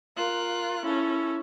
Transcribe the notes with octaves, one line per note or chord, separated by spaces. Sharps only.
F4 A#4 F#6
C#4 E4 A4